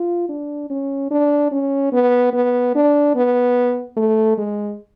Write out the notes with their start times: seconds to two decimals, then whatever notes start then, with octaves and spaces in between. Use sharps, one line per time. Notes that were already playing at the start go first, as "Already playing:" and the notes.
Already playing: F4
0.29 D4
0.70 C#4
1.11 D4
1.52 C#4
1.92 B3
2.33 B3
2.75 D4
3.15 B3
3.97 A3
4.38 G#3